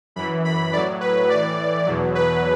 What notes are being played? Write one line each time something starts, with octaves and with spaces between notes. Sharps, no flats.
F#2 E3 B5
B5
A2 F#3 D5
B4
A2 E3 D5
E2 B2 F#3
B4